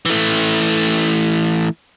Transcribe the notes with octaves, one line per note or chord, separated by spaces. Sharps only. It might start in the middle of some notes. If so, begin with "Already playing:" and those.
E3 A3